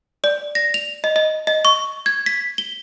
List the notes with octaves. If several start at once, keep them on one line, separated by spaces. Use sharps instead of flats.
D5
A#6
F7
D#5
D#5
D#5
C#6
G#6
B6
G7